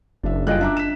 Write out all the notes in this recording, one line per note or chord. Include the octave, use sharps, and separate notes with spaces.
F#1 D4 E5
G3 F4 G#4 D#5 G5 F#6
D4 E5 A#5 D6
B6 E7